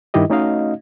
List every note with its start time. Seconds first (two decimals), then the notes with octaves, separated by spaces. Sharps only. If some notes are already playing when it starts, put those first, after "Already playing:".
0.14 G2 D#3 E4 G4 D#5
0.30 A3 C#4 D#4 F#4 D#5 F5